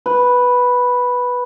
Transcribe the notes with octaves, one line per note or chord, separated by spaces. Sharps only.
B4